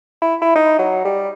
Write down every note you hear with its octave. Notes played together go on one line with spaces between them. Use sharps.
E4
E4
D#4
F#3
G3